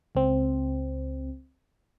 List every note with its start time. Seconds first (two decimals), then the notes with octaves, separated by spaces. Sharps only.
0.15 C#2 C4